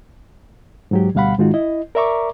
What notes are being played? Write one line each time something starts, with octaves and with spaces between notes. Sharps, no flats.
G#2 F#3 G4
D2 B2 G3 F5 F#5 B5
G#2 D#3 G#3 D#4 F4 F#4
E4 D#5
A#4 D5 E5 A#5 C#6 D6